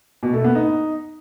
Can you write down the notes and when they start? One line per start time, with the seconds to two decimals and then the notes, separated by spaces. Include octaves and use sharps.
0.23 B2
0.33 A3
0.44 B3
0.55 D#4